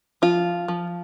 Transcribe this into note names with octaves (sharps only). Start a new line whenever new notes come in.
F3 F4
F3